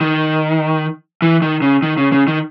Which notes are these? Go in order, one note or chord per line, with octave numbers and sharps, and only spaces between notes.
D#3
E3
D#3
C#3
D#3
C#3
C#3
D#3